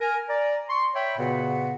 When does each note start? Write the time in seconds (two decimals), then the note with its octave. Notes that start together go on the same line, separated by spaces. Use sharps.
0.01 A#4 G#5
0.29 D5 A#5
0.70 C6 C#6
0.95 C#5 E5 G5 B5
1.18 A#2 C#3 B3 F#4 B4 F#5